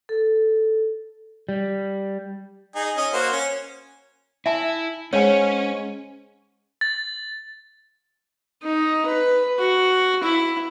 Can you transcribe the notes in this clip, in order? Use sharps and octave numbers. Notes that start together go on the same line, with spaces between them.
A4
G3
D#4 G#4
C#4 D#5
A#3 F#4 C5
C#4
E4 E5 G#5 A5
G#2 C#4 C#5 G#5
A6
D#4
B4
F#4
E4